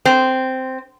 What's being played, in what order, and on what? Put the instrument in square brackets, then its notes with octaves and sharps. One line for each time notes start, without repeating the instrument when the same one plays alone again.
[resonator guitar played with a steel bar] C4